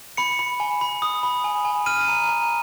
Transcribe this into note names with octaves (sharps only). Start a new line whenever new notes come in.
B5 C#7
B5
G#5
B5
D#6
B5
G#5
G#5
F6 D#7
A#5
A#5